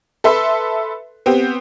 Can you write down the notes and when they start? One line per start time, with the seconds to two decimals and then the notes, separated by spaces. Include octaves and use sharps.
0.24 A4 B4 E5 C6 E6
1.26 B3 C4 G4